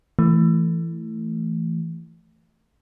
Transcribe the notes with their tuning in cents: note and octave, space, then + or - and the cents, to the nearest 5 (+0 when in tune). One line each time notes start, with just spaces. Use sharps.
E3 +10 A3 +10